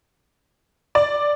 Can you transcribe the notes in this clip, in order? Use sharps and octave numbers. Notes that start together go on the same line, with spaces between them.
D5